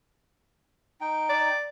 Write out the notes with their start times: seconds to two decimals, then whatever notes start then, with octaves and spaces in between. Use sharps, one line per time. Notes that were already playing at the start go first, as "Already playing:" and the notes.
1.01 D#4 G5
1.29 D5